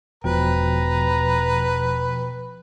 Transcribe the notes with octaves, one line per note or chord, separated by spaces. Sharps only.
E1 B2 F3 B4 G5 A#5